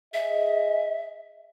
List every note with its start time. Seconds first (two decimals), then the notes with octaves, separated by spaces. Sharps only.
0.14 G#4 D#5 E5